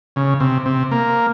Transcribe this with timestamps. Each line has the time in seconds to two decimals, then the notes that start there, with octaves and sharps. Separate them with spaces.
0.16 C#3
0.40 C3
0.66 C3
0.91 A#3